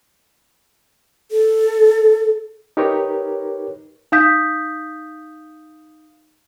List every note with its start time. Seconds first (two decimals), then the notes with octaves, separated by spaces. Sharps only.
1.31 A4
2.77 D#4 G4 A#4 B4 C#5
4.12 D#4 F5 D#6 G6 B6